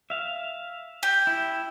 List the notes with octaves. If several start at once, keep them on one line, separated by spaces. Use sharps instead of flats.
E5 F5
G4
E4